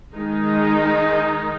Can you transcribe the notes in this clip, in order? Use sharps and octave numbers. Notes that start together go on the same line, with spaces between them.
D#3 G#3 D#4